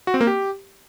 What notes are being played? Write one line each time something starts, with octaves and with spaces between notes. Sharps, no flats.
F#4
C4
A#3
G4